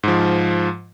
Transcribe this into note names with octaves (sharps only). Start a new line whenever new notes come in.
G#2 F3